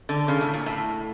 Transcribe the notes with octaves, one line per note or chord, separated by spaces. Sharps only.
D3
C#3
A2
A#2
A2